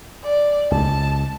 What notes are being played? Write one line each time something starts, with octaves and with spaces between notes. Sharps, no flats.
D5
C#2 A5